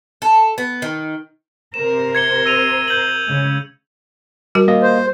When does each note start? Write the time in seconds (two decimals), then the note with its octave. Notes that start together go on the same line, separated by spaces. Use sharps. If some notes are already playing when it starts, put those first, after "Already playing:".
0.22 A4
0.58 B3
0.82 D#3
1.74 C3 A#4 C5 E7
2.15 G#6 C#7 G7
2.46 E6 D#7 F7
2.88 G6 F#7
3.26 C#3 G#3
4.55 G3 F#4 A#4
4.68 A#3 D#5
4.83 C5